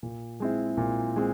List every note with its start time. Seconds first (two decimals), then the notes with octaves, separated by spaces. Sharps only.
0.03 A#2
0.40 G#3 C4 E4
0.77 A#2
1.16 G#3 C4